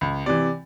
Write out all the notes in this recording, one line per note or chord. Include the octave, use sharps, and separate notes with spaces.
C#2
C3 E3 D5